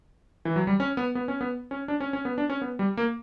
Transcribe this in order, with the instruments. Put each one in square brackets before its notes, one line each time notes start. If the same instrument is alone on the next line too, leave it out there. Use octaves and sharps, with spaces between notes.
[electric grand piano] E3
F#3
G3
C#4
B3
B3
C#4
B3
C#4
D4
C#4
C#4
B3
D4
C#4
B3
G3
A#3